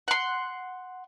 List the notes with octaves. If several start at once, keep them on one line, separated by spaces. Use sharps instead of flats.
F#5 C6